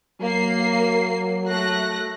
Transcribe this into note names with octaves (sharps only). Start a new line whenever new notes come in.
F#3 A#3 C7
A3 F#6 A#6